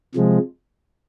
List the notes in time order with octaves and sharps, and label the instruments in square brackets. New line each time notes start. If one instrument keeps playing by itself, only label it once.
[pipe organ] C3 F3 G#3